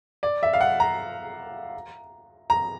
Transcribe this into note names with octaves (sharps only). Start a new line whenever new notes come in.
D5
E5
F5
F#5
A#5
A#5